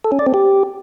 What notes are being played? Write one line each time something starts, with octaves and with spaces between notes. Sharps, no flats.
A4
C#4
D5
C4
G4